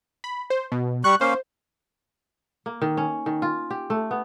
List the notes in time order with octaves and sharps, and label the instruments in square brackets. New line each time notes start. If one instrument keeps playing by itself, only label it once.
[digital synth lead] B5
C5
B2
[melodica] G3 C#6 [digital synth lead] F#6
[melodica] A#3 C#4 F5 [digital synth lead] C5
[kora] A#3
D#3
C#4
D#3
F4
G4
A3
B3